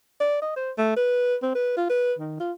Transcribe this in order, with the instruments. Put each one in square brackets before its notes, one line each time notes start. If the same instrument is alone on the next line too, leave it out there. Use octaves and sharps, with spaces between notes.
[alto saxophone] D5
D#5
C5
A3
B4
C4
B4
F4
B4
D#3
F4